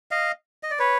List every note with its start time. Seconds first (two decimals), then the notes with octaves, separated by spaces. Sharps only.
0.11 D#5 F5
0.63 D#5
0.71 D5
0.79 B4 C#5